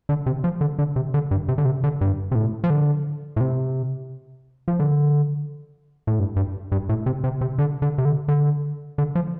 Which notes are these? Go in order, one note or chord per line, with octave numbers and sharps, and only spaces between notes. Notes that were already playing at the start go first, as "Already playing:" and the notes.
D3
C3
F3
D3
D3
C3
D3
G2
C3
D3
C3
D3
G2
C3
A2
F3
D3
A2
C3
F3
D3
A2
G2
G2
G2
A2
C3
C3
C3
D3
D3
C3
D3
D3
D3
F3